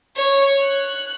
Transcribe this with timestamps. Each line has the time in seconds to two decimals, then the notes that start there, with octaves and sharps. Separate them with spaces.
0.16 C#5
0.63 F#6